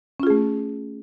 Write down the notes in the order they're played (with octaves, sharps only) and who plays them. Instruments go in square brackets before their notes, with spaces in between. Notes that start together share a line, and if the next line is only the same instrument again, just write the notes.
[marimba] C#4
F4
G#4
A3